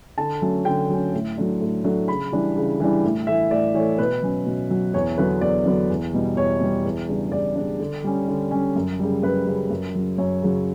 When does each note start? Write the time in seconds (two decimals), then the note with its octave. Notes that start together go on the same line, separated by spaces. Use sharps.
0.18 D3 A5
0.41 F#3 A3 C#4
0.65 D3 G5
0.89 F#3 A3 C#4
1.13 A2
1.38 F#3 A3 D4
1.61 A2
1.84 F#3 A3 D4
2.08 C#3 B5
2.32 E3 G3 D4
2.56 C#3
2.80 E3 G3 D4
3.04 A2
3.27 E3 A3 E5
3.51 A2 D5
3.75 E3 C#5
3.79 A3
3.98 B2 B4
4.23 F#3 C#4
4.46 B2
4.70 F#3 C#4
4.94 E2 C#5
5.18 D3 F#3 B3 B4
5.41 E2 D5
5.66 D3 F#3 B3
5.90 E2
6.13 B2 G3
6.36 E2 C#5
6.60 B2 G3
6.84 E2
7.09 C#3 G3 D4
7.32 E2 D5
7.56 C#3 G3 D4
7.80 D3
8.04 G3 C#4
8.28 D3
8.51 G3 C#4
8.76 F#2
8.99 C#3 G3
9.23 F#2 B4
9.46 C#3 G3
9.70 F#2
9.94 C#3 F#3
10.18 F#2 C#5
10.42 C#3 F#3